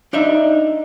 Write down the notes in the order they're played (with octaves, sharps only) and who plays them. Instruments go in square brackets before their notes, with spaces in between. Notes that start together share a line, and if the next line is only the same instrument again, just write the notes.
[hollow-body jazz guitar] D4 D#4 E5